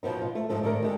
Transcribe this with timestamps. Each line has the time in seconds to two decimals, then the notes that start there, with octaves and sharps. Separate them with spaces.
0.03 B2 F3 B3 D#4
0.22 F4
0.35 A3
0.50 G#2 F3 A4
0.63 D3 D#3 A3 A#4
0.83 G3 G#3 A4